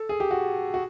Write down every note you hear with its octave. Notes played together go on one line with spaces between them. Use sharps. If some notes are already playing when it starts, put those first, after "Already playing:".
Already playing: A4
G#4
G4
F#4
F#4